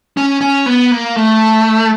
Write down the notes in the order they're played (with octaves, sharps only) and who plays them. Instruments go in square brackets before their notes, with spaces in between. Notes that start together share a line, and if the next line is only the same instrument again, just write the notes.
[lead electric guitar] C#4
C#4
B3
A#3
A3